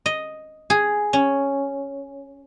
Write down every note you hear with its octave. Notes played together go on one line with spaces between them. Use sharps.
D#5
G#4
C#4